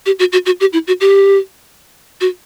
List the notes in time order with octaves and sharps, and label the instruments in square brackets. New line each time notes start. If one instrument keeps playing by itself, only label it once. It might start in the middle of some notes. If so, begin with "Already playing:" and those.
[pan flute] G4
F#4
F#4
F#4
G4
E4
F#4
G4
F#4